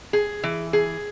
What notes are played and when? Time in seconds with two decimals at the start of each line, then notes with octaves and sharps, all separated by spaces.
0.13 G#4
0.43 E3
0.73 G#4